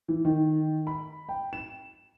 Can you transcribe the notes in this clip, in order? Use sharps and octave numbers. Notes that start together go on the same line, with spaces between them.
E3
D#3
B5
G5
E7